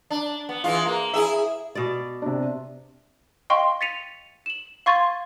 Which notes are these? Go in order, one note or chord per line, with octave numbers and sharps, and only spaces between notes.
D4
B3
E3 G#3 F4
A#3
E4 G#4 E5
B2 D5
C3 D4
D#5 F5 G5 C6 C#6
A6 B6 C#7 D#7 F7
E7 F#7
F5 C6 C#6 G#6 A6 D#7